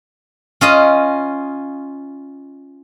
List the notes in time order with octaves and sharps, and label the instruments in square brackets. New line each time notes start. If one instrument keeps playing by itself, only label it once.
[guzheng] C#4 F4 D#5